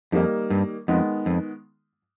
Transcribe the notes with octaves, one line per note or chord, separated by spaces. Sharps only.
F2 D#3 G3 A#3 D#4
G2
F2 D#3 G#3 B3
F2